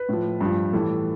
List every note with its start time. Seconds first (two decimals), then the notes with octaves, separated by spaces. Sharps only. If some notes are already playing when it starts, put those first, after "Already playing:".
Already playing: B4
0.09 A2 F3
0.41 G2 F3
0.73 A2 E3 G3 A4